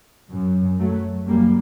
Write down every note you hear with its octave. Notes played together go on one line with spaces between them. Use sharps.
F#2
F#3 A3
F#2 G3 A#3